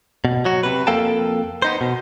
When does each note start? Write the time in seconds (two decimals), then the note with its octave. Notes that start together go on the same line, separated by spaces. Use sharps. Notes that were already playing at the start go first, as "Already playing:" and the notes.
0.25 B2
0.45 F#3 F#4
0.63 C3 B4
0.87 F2 A#3 A4 F5 G5 A5
1.62 B3 D#4 C5
1.81 B2